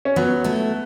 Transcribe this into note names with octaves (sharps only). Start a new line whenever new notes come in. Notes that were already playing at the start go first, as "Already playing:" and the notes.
C#4
F#3 B3
A3 E4 A4